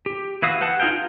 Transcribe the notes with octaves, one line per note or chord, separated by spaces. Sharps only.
G4
E3 E4 F#4 F5 D#6
G4 B4 F#5 A5
D#4 F4 G#4 F5 G5
F4